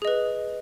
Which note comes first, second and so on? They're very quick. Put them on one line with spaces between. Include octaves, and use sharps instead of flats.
G#4 D#5 B4